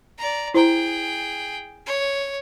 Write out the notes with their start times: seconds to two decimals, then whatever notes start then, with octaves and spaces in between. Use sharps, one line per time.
0.18 D5 A#5
0.54 E4 G#4 C5 G5 A#5
1.86 C#5